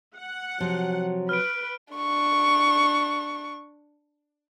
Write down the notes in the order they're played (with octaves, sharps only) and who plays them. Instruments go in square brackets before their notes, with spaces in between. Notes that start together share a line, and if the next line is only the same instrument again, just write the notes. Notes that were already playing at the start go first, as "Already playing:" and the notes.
[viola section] F#5
[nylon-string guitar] C3 F3 [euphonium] F#3
[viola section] B4 [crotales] F6 D7
[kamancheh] D4 C#6